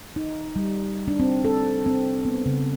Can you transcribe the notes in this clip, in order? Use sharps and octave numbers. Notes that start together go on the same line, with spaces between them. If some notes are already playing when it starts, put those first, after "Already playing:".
D#4
G3
D4
C4
A4
C4
B3
C#3